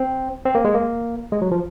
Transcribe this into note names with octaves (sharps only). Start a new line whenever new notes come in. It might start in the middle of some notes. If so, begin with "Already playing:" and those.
Already playing: C4
C4
A#3
G#3
A#3
G#3
F#3
F3